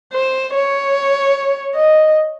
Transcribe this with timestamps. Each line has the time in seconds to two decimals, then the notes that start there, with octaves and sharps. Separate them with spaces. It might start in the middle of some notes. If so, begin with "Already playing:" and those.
0.13 C5
0.54 C#5
1.75 D#5